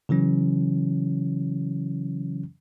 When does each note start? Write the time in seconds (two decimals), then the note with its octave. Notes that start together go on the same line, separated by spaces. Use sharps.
0.09 C#3 E3 F#3 C#4